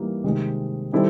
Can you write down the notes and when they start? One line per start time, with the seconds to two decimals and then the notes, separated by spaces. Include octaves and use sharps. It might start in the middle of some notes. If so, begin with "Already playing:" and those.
Already playing: E3 G3 A#3 D#4
0.24 C3 D#3 G#3
0.92 D#3 G3 C4 E4 A4